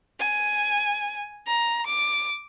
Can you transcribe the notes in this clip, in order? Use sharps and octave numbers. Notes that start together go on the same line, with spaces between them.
G#5
A#5
D6